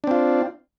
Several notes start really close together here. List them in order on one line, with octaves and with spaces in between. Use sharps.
D4 C4 F4